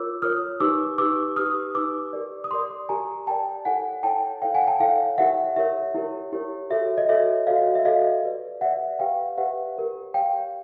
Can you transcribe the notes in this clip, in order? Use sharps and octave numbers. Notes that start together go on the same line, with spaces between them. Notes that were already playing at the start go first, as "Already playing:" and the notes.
Already playing: F4 A#4 C#5 D6 E6
F4 A#4 C#5 D#6 F6
D#4 G4 B4 D6 E6
D#4 G4 B4 D6 E6
D#4 G4 B4 D#6 F6
D#4 G4 B4 D6 E6
G4 A#4 D5
D#6
G4 A#4 D5 C6 D6
G4 A#4 D5 G#5 A#5
G4 A#4 D5 G5 A5
E4 A4 C#5 F#5 G#5
E4 A4 C#5 G5 A5
E4 A4 C#5 F5 G5
F#5 G#5
G5 A5
E4 A4 C#5 F5 G5
E4 G4 A#4 C#5 E5 F#5
E4 G4 A#4 C#5 E5
E4 G4 A#4 C#5
E4 G4 A#4 C#5
F#4 A4 C#5 E5
D#5
F#4 A4 C#5 E5
F#4 A4 C#5 D#5 F5
E5
F#4 A4 C#5 D#5 F5
G4 B4 D5
G4 B4 D5 E5 F#5
G4 B4 D5 F5 G5
G4 B4 D5 E5 F#5
G4 A#4 C#5
G4 A#4 C#5 F5 G5